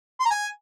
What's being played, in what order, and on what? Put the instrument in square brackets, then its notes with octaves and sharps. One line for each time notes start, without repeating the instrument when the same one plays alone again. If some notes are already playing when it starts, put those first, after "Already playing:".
[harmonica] C6
A#5
G#5